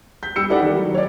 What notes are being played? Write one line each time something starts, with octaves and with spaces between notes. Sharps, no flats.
G6 B6
G3 E6 C#7
D#4 E4 G4 A4 D5 F#5
D#3 G3
F#3
C#5 D5